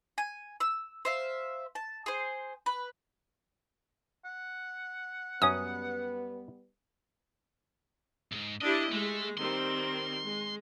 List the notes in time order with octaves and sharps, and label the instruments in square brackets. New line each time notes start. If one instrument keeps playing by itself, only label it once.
[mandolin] G#5
E6
C5 E5 F5
A5
G#4 C5
B4
[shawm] F#5
[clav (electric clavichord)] F#2 C#4 [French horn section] G3 B3 B4 [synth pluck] D#6
[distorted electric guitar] C2 G#2
[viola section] D4 E4 G4 [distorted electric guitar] D#5
[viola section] G#3 [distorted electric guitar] A3
[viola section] D#3 G3 C4 [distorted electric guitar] C6
[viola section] G#3